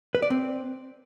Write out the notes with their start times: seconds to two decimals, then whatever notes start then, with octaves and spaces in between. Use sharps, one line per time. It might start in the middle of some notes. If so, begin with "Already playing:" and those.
0.15 B4
0.22 D5
0.30 C4